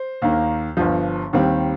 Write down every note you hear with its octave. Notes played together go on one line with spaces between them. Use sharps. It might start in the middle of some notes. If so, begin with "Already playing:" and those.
Already playing: C5
D#2 D#3 A#3
G1 G2 F3
D#2 D#3 G3 C4